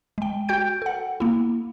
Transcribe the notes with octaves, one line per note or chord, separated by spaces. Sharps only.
G#3 G5
F#4 G5 G6 D7
A4 F#5
A#3 E4